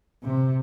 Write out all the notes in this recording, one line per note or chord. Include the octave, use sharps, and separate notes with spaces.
C3